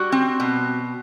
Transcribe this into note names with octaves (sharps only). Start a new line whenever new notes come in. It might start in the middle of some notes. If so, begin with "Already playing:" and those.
Already playing: G3 F#4
C4
B2